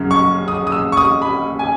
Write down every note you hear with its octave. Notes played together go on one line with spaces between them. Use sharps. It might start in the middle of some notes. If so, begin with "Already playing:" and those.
Already playing: F#2 C#3 F#3
C#6
D#6
D#6
E6
C#6
D#6
B5
G#5